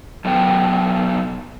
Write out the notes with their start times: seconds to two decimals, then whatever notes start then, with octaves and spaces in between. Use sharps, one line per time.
0.25 B2 F#3 B3 A4 G5